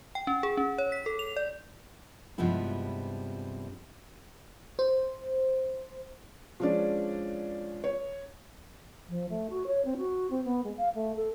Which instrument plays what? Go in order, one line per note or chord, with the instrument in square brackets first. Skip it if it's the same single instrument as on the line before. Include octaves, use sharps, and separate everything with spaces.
[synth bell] G5
C#4
G#4
C#4
C#5
B6
A4
F7
D5
[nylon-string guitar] G2 C3 F3 G#3 B3 E4
[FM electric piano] C5
[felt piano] F3 G#3 C#4 D4 D5
C#5
[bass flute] F3
A3
F#4
C#5
C4
F#4
C4
B3
G#3
F5
A3
A4